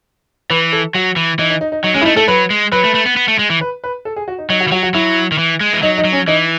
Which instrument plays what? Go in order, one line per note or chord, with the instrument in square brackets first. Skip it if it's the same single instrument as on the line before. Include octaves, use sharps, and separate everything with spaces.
[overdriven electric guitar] E3 [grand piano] B4
[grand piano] A4
[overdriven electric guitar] F#3 [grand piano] F#4
[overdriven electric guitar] E3
[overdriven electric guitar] E3 [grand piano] D#4
[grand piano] D#4
D#4
D#4
[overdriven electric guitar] F#3 [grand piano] D#4
[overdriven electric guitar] G#3 [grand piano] C#4
[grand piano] E4
[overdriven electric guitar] A3 [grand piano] D#4
[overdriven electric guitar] A3 [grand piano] A4
[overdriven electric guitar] F#3 [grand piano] B4
[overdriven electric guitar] G#3
[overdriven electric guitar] F#3 [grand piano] B4
[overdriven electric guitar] A3
A3
B3
B3
A3
G#3
E3
[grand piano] B4
B4
A4
G#4
F#4
D#4
[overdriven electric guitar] F#3 [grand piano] D#4
[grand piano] F#4
[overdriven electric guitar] E3
[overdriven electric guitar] F#3 [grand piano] F#4
[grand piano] F#4
[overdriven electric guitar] F#3 [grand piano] E4
[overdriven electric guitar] D#3
E3
G#3
E3
[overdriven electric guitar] F#3 [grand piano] D#4
[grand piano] D#4
[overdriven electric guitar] F#3
[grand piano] C#4
[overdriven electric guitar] E3 [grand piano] D#4